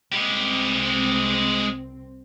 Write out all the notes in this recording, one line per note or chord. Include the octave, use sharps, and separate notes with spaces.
C2 G#3 C4 G4